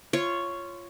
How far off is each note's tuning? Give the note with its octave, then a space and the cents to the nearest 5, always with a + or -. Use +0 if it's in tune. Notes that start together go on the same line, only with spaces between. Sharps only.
F4 -15 C#5 +0